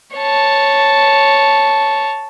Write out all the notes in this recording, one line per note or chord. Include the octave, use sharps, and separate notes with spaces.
C#5 A5